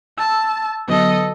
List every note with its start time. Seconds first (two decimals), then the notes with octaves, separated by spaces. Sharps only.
0.18 A5 E6
0.88 D3 F#3 B3 A4 D#5